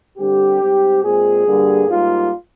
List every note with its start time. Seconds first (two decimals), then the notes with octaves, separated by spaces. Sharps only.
0.18 D3 G3 C4 G4
0.60 G#2 G3 C4
1.03 A#2 G#3 C4 G#4
1.46 G2 D3 G3 A#3
1.88 G#2 G3 A#3 F4